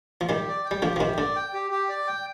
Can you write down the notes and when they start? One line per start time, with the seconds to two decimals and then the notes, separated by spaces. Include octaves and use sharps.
0.21 F3
0.29 D#3 G3 G4
0.48 D5
0.65 G5
0.71 G3
0.82 D3 F3 G4
0.96 F3
1.00 C3 D#3 G4
1.18 D3 D5
1.36 G5
1.54 G4
1.71 G4
1.89 D5
2.07 G5